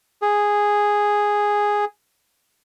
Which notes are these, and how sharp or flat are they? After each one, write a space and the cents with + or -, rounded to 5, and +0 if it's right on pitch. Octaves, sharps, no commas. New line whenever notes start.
G#4 -5